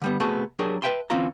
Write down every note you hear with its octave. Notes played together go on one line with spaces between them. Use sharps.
D3 G3 B3
C3 A3 B3 F#4 G#4 A5
F#3 D4 G4 G#4 A#4
B4 C5 E5 G5 A5 C6
D2 E3 C4 C#4 F4 A#5